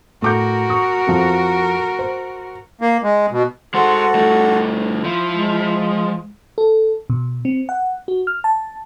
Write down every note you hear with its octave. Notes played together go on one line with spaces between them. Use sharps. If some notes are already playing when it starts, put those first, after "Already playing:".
A2 F#4 A#4 D6 G6
C#6 D#6
F2 F3
C5
A#3
G#3
B2
G#3 F#4 A4 C5 F#5
G2 A3
F3 E4
G#3
A4
B2
C4
F#5
F#4
F6
A5